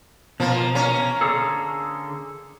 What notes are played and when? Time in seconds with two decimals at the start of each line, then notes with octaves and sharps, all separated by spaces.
0.40 B2 F3 A#3
0.75 A#3 C#4
1.21 D3 G#4 A4